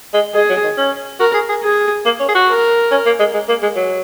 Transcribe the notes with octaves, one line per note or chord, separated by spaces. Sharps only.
G#3
G#3 G#4
F#3
D#3
C#4
F#4 A#4
G#4
G#4
G#4
A#3
C#4
G#4
F#4
A#4
C#4
A#3
G#3
G#3
A#3
G#3
F#3